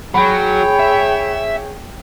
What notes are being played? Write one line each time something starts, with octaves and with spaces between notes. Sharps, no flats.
F#3 G#4 C#5 G5 B5 D7
E5